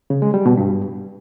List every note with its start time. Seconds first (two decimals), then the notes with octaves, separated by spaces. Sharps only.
0.10 C#3
0.22 G#3
0.34 G3
0.46 B2
0.57 G2